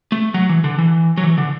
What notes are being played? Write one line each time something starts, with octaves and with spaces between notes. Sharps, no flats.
A3
F#3
E3
D3
E3
F#3
E3
D3